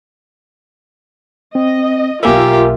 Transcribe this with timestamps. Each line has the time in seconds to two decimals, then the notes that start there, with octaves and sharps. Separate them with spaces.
1.55 C4 D#5
2.23 B1 A#3 F4 G4 A#4 E5 G#5 A#5